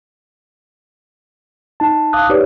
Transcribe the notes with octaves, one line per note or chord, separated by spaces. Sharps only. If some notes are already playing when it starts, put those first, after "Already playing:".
D#4 A5
F5 A5 D6 D#6 F#6
D#4 G4 B4 C#5 D5